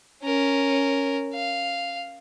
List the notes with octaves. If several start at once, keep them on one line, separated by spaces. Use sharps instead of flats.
C#4 A#4
F5